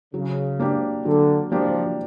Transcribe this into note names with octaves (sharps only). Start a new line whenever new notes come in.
C#3 F#3
A#3 D4 G4
D3 F#3
F3 A#3 D4 G4